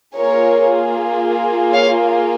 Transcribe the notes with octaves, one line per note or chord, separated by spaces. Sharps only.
A#3 F4 G#4 A#4 C#5
C#5 F5